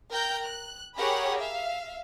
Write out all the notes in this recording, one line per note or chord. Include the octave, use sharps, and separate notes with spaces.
A#4 G5 A#5 G6
F#6
G4 G#4 A#4 C#5 F#5 B5
E5 F5